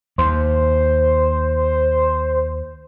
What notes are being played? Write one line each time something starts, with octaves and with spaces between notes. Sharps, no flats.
D#2 C5